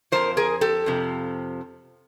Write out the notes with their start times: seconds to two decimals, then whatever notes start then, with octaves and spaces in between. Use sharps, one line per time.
0.12 F2 C3 F3 A#4 C5
0.37 G#4 A#4
0.61 G4 A4
0.86 F2 C3 F3